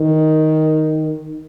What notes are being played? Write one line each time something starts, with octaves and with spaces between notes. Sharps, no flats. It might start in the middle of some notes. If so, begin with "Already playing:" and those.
Already playing: D#3